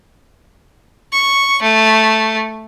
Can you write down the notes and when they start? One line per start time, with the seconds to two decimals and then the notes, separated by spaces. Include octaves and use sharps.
1.12 C#6
1.62 A3